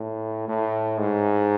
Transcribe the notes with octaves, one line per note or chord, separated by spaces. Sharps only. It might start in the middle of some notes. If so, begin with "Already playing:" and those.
Already playing: A2
A2
G#2